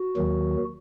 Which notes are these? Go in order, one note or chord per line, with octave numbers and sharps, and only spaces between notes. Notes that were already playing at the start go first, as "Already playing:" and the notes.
Already playing: F#4
D#2 D#3 F#3